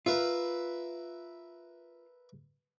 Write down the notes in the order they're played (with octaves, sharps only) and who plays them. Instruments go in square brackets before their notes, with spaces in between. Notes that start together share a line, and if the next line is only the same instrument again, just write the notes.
[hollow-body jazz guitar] F4 [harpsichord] A#4 B4 E5